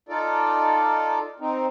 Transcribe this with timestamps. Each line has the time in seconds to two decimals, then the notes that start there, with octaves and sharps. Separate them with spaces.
0.09 D#4 F4 A4 D5
1.40 C4 D#4